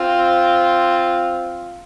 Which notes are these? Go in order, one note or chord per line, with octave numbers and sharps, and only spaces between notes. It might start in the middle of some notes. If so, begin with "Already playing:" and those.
Already playing: C4 F4